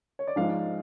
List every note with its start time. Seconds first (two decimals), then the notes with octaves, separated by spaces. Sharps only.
0.19 C#5
0.27 D5
0.36 G#2 F3 G#3 F5